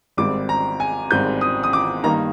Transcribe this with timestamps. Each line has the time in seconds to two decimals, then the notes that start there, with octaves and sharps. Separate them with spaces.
0.17 G#1 G#2 G3 C4 D6
0.49 A#5
0.80 G#5
1.11 G#1 G#2 G3 C4 G6
1.41 D#6
1.63 D#6
1.73 D6
2.03 G2 D#3 A#3 D#4 A#5